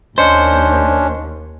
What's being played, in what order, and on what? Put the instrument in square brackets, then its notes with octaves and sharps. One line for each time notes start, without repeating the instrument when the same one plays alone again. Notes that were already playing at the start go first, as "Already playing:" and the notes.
[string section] D#2 [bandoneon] C#4 D4 [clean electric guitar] C5 [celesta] D#5 C#7